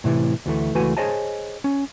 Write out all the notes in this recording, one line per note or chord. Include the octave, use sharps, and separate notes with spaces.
A2 C3 E3
D2 E3 A3
C#2 E3 A3 F#4 B4 G#5
G#4 C5 C#5 D#5 G#5 A5
C#4